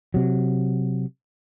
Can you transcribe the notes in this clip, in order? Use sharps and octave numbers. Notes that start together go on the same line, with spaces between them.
C3 F#3